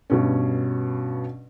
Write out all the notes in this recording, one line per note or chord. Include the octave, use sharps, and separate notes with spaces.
G2 B2 C#4